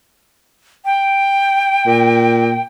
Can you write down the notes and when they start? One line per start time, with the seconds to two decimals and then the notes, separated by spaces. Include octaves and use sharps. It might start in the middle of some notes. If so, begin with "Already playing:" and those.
0.85 G5
1.86 A#2